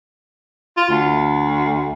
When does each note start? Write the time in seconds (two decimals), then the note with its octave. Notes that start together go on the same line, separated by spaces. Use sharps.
0.77 F4
0.89 D2